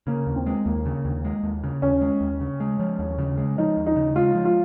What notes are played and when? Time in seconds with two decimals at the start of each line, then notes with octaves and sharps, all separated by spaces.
0.07 C#3 A#3
0.27 D#2
0.36 C4
0.46 G#3
0.66 D#2 A#3
0.85 C#3
1.05 D#2
1.25 G#3
1.43 D#2
1.64 C#3
1.82 D#2 C#4
2.01 G#3
2.21 D#2
2.40 C#3
2.60 G#3
2.79 F3
2.99 D#2
3.18 C#3
3.38 G#3
3.58 F3 D#4
3.77 D#2
3.86 D#4
3.96 C#3
4.16 G#3 F4
4.35 F3
4.45 F4